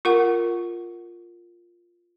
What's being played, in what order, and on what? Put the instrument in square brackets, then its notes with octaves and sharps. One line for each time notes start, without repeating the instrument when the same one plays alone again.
[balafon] F4 A#4 F#5